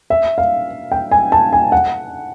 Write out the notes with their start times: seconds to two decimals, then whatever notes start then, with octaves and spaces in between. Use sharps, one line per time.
0.10 E5
0.38 F5
0.92 G5
1.11 G#5
1.32 A5
1.53 G#5
1.72 F#5